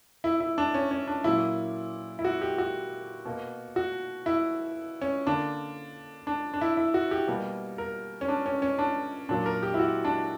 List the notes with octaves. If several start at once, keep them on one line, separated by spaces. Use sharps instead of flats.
E4
E4
D4
C#4
C#4
D4
A#2 F#3 A#3 E4
E4
F#4
G4
F#4
B2 A#3
F#4
E4
C#4
D3 A#3 D4
D4
D4
E4
E4
F#4
G4
B2 G3 A#3
A#4
C#4
D4
C#4
C#4
D4
A#2 F#3 A#3 D4
A#4
G4
E4
F#4
D4